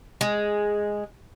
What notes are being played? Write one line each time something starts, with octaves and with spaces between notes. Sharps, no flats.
G#3